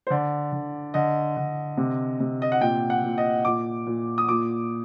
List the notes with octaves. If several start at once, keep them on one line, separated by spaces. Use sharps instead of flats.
C5
D3 D5
D3
D3 D#5
D3
C3
C3
D#5
F#5
A#2 G5
F#5
A#2
D#5
A#2 D6
A#2
D#6
A#2 D6